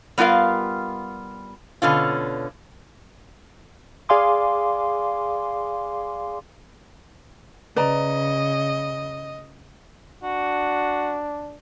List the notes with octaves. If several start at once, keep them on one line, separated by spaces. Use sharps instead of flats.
G3 B3 F4 A#4 F5
B2 D3 C#4 F4
G#4 D5 F5 G#5 C6 D6
C#3 B4 D5 D#5 A#5
D4 F#4